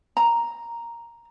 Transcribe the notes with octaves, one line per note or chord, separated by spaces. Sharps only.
A#5